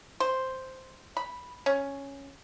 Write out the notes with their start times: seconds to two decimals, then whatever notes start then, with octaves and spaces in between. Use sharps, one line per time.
0.20 C5
1.17 B5
1.66 C#4